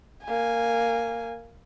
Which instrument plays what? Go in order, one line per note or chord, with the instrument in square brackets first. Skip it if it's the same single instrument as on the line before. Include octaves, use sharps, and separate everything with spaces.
[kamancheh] A#3 G#5